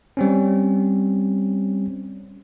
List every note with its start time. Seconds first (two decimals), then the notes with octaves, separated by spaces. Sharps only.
0.17 G3 C4 C#4